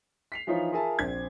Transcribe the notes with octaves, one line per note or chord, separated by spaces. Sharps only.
B6 C7 F7
E3 F3 D#4 F4 C#5
F4 G#4 A#4 E5 G#5 A5
A#1 C4 G#6